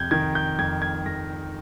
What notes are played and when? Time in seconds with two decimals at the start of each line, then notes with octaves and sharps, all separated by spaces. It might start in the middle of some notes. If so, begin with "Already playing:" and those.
Already playing: F2 C3 G6 G#6
0.11 D#3 G#6
0.35 G6
0.59 F2 G#6
0.82 G#6
1.06 F2 A#6